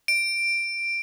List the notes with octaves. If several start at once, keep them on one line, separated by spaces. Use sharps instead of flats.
D7